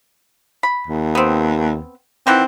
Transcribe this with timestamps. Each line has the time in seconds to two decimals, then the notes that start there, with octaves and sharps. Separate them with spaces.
0.63 B5
0.87 D#2
1.15 B3 C4
2.27 D#3 E3 C4 F#5